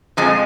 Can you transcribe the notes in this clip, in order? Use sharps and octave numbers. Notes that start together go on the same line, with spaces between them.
F2 F3 G#3 G#5